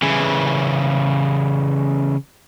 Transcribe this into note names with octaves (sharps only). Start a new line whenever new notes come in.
C#3 E3